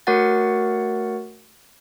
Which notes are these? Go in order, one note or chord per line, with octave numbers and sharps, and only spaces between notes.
A3 F#4 A#4 C#5 F#5 A6